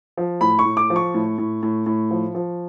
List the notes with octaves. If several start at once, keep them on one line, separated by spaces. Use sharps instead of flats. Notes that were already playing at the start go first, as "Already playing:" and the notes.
F3
A2 B5
C#6
A2
D6
F3
C#6
A2
A2
A2
A2
F3
F3